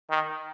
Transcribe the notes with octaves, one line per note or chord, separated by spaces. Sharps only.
D#3